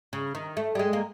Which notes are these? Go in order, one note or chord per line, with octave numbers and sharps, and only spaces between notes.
C#3
D#3
A3
G3
G#3
A#3